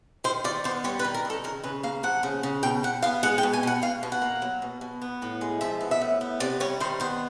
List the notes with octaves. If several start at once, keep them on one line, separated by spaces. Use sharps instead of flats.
D#3 C5
D#3 D5
B3 C5
G3 C#5
B4
D#3
A#4
D#3 A4
C#3 A#4
C#3 B4
A#3 F5
F3 F#5
C#3
C#3
B2 G5
B2 F#5
B3 F5
G#3 F#5
G5
B2
G#5
B2 F#5
B2 F5
B2
F#5
A#3
F#3
B2
B2
B3
A2
G#3
F3 E5
B3
E5
A2
B3
C3 D5
G3 C#5
D#3 C5
B3 C5